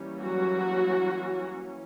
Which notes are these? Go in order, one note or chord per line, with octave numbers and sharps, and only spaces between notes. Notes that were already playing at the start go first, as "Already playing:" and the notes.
Already playing: E3 G3 A#3 C#4
F#3 F#4